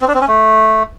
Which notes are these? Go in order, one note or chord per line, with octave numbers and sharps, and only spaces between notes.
C4
D4
C4
C#4
A3